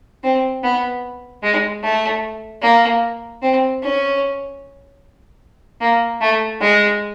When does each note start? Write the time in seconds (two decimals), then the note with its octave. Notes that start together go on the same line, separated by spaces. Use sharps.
0.24 C4
0.64 B3
1.43 G#3
1.83 A3
2.63 A#3
3.42 C4
3.83 C#4
5.81 A#3
6.21 A3
6.61 G#3